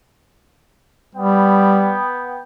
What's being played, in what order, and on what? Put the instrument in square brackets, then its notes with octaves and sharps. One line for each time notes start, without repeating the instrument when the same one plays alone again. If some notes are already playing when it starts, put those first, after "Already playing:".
[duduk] G3 [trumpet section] B3 G5